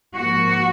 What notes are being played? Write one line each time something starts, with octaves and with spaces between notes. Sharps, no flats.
G#2 F3 A#3 F#4